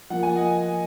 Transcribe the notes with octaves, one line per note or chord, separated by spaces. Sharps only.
F3 A#3 F4 F#5
G#5
D#5 F#5